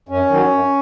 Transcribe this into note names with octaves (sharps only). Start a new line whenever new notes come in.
F#2 C#4
D#3 F#3
F#2